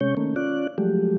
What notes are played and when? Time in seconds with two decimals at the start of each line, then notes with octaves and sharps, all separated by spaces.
0.01 C3 G#3 C#4 C#5 G6
0.17 D#3 A3 A#3 C#4
0.36 C#4 F4 D5 F#6
0.78 F3 F#3 G#3 A3 G4